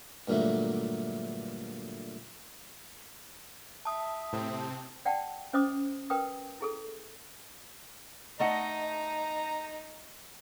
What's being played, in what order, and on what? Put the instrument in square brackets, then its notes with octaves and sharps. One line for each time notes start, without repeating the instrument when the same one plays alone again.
[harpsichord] G2 A#2 D3 F#3 A3
[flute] E5 [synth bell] A5 D#6
[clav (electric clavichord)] A2 [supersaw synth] C3 C4
[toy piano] D5 F#5 G5 A5
C#4 C5 D#5 D6 D#6
A#4 B4 G5 D#6
E4 G#4 A4
[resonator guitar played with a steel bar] A3 D#5 F#5 [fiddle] D#4 [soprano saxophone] A#5